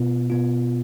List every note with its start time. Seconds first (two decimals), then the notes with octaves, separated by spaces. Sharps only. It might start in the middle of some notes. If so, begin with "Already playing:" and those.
Already playing: B2 B3 F4
0.30 B2 B3 F4